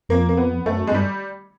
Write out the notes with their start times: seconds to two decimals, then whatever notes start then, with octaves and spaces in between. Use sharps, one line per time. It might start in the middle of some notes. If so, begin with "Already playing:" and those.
0.09 F2 A#3
0.29 A#3
0.37 B3
0.66 F#2 A3
0.87 G#3
0.92 G2 G3